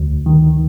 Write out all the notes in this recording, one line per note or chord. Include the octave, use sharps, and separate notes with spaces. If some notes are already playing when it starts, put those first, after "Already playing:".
Already playing: D2
D#3